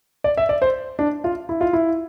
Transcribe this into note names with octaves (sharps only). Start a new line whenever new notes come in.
D5
E5
D5
C5
D4
F4
E4
F4
E4